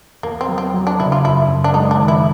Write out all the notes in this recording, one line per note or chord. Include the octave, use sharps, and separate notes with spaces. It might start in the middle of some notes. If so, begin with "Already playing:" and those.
E2 A#3
C4
F#3
C4
F#3
D4
C#3 E4
F4
F#2 E4
F#2
D4
G#3 D#4
D4
D#3
E4